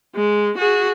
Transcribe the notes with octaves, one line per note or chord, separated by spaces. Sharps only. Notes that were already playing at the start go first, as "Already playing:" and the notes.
G#3
F#4 G#4